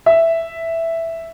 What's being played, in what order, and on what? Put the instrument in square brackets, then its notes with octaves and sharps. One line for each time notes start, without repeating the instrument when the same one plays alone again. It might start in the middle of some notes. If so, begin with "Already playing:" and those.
[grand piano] E5